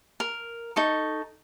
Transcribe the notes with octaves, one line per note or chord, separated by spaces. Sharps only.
A#4
D#4 A4 C#6